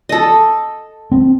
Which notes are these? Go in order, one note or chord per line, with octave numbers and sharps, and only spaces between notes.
A4 D#5
C4